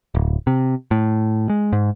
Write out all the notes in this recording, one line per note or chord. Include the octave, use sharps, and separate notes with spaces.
D1
C3
A2
G#3
G#2